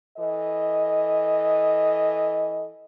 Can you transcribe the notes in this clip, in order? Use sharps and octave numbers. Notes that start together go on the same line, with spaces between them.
E3 A4 D#5